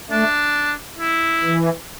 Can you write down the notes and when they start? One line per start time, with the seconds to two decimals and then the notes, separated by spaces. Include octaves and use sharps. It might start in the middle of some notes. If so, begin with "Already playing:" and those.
0.11 A3 D4
0.99 E4
1.43 E3